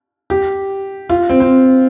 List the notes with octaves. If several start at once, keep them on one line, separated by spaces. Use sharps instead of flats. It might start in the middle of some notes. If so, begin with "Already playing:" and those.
G4
F4
C4
C4